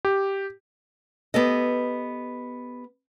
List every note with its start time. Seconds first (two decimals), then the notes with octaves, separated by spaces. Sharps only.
0.05 G4
1.34 B3 G4 A4 D#5